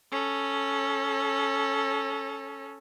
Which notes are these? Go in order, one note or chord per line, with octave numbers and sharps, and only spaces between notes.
C#4 A4